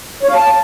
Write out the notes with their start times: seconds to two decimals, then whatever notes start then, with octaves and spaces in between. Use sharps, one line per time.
0.23 C#5
0.29 F5
0.35 A5